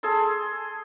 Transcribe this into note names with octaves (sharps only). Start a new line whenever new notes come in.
G#4 A4 C6